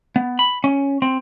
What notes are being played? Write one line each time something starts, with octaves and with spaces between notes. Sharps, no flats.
B3
B5
C#4
C4